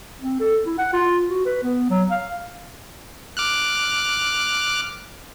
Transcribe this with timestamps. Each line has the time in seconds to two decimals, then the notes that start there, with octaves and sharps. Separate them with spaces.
0.22 C4
0.40 A4
0.66 E4
0.78 F#5
0.93 F4
1.29 F#4
1.45 B4
1.63 B3
1.90 F#3
2.11 F5
3.37 D6 F6 F#6